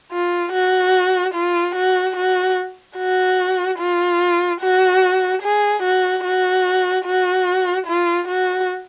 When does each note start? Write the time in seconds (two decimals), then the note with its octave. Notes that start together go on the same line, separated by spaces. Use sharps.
0.12 F4
0.53 F#4
1.34 F4
1.75 F#4
2.16 F#4
2.97 F#4
3.79 F4
4.61 F#4
5.42 G#4
5.83 F#4
6.24 F#4
7.05 F#4
7.87 F4
8.27 F#4